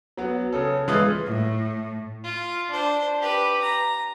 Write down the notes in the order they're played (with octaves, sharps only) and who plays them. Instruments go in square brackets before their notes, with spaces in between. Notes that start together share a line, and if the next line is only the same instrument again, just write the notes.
[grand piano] F#3 B3
C#3 C#4 A4
E3 G#3 F4 B4 D#6
[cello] A2 A3
[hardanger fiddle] F4
D4 C5
G4 B4
A#5